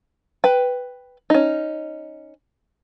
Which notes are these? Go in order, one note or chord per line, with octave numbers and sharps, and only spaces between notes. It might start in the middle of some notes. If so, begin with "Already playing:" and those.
B4 G5
C#4 D#4